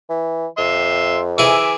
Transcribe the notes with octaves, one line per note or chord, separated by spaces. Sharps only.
E3
F2 E5 C6
E3 G#4 E5 D6